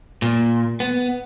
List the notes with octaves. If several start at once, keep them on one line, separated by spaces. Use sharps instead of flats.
A#2
B3